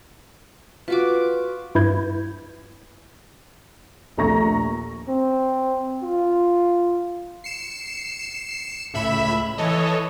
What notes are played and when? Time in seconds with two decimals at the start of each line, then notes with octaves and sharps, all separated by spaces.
0.88 F4 F#4 B4 D6
1.75 G2 E4 B4 G6 G#6
4.17 A#1 D#2 A3 A#5 C#6 A#6
5.08 C4
6.03 F4
7.44 C7 C#7 E7
8.94 C#2 A2 E5 B5 E7
9.58 E3 A4 C#5 D#5